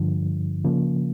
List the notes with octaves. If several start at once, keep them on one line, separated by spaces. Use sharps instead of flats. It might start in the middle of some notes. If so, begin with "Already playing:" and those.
Already playing: G2 D3 F3
C#3 F3 A#3